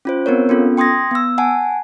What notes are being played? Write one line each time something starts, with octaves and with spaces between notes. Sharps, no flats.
C#4 F4 C5
B3 C4 A#4 C#5
B3 C#4 F4 A4
G5 C6 D#6 G#6 A#6
B3 E6
F#5 G#5 A5